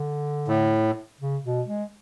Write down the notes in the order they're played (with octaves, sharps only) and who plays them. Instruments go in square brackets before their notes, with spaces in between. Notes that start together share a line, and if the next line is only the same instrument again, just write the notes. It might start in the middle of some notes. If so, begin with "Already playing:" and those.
Already playing: [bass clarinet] D3
[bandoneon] A2
[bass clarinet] C#3
B2
G#3